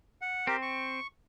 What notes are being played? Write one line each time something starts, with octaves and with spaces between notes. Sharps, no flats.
F#5
C4 G4 A#4
C#6